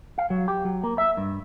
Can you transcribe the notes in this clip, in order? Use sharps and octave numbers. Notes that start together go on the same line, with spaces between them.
F5
F#3
G4
F#3
A#3
E5
G2